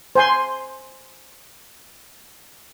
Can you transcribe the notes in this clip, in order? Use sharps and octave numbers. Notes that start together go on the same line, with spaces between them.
C5 G#5 C6